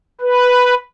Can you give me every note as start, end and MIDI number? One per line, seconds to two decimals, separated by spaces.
0.21 0.74 71